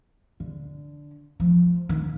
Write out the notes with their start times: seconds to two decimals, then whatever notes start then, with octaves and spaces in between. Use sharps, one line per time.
0.40 D3
1.40 F3
1.89 D#3